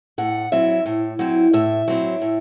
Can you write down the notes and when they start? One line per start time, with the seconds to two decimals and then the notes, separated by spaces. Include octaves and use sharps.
0.18 A2 F#5
0.52 F#3 C4 E4 E5
0.86 A2
1.19 F#3 C4 E4
1.53 A2 E5
1.88 F#3 C4 E4
2.21 A2